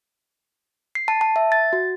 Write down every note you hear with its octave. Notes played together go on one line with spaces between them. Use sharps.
C7
A5
A5
E5
A6
F#4